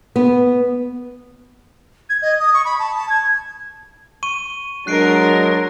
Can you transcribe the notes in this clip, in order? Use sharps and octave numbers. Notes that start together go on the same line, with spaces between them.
B3
G#6
D#5
D#6
C#6
B5
A5
A5
G#6
C#6 D#7
F#3 G#3 D4 A#4 F#6 C7 D7